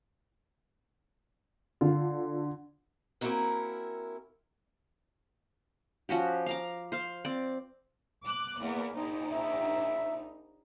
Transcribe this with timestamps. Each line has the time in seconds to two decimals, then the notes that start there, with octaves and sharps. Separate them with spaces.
1.81 D3 F4
3.21 A#3 C4 C#4 E4 F#4 A#4
6.09 F3 C#4 F#4 G4
6.46 F5 A#5 D6
6.92 C5 F5
7.25 C4 D5
8.24 D6 F#6
8.60 E2 A#3
8.95 A#1 D#4
9.32 E5